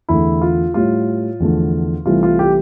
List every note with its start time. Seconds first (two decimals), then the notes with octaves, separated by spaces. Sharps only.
0.09 E2 D3 A3 E4
0.41 F4
0.74 A2 G3 F4
1.40 E2 D3 F3 A3
2.06 C2 C3 E3 A3 F4
2.23 F4
2.39 G4